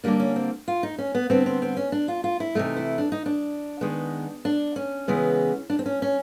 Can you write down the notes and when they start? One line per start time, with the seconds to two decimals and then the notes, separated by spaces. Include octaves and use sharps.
0.04 D3 G3 A#3 D4
0.20 C#4
0.36 C4
0.68 F4
0.83 D#4
0.98 C#4
1.15 B3
1.30 D3 G3 B3 C4
1.46 C4
1.62 C4
1.77 C#4
1.92 D4
2.08 F4
2.24 F4
2.40 E4
2.55 C3 E3 A3 D#4
2.77 E4
2.98 D4
3.12 D#4
3.26 D4
3.81 D#3 G#3 B3
4.45 D4
4.76 C#4
5.08 C#3 E3 G#3 B3
5.70 D4
5.79 C4
5.86 C#4
6.02 C#4